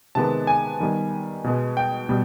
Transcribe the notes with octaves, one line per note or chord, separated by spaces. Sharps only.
C3 D#3 G#3 B3 A5
G#5
D#3 G3 B3
B2 G#3 B3
G5
B2 G3 B3